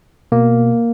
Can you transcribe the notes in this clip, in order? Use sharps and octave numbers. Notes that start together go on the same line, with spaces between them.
B2 A#3